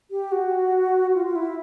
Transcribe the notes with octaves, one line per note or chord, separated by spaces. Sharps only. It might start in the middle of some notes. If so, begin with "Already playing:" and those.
G4
F#4
F4
F4
E4